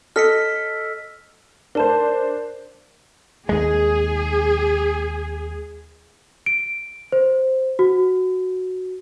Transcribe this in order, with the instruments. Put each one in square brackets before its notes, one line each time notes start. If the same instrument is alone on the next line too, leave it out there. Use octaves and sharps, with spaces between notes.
[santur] A4 D#5 [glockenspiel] F6 B6 C#7
[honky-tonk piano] D4 C5 [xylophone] A#4 A5
[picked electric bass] D#2 G#3 [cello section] G#4
[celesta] D7
C5
F#4